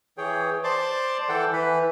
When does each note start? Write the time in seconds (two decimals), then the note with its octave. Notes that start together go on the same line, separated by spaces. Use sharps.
0.18 E3 G#4 C#5 G5
0.64 C5 D5 A5 C6 D6
1.29 E3 A4 F#5 G5
1.53 E3 B4